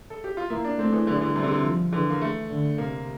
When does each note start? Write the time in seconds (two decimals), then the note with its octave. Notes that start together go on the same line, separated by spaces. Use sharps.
0.10 A4
0.24 G4
0.37 F4
0.50 A#3 E4
0.64 D4
0.78 A3 C4
0.93 E3
1.07 D3 G3
1.15 E3
1.21 D3
1.36 C3 G3
1.43 D3
1.51 C3
1.64 F3
1.92 D3 E3
2.10 A#3
2.22 A3
2.49 D3
2.78 C3 A#3